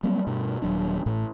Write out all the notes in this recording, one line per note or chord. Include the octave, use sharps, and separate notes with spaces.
F#3 G3 A#3 C4
G2 B2
D#1 F#3 D4
A1 A2 A3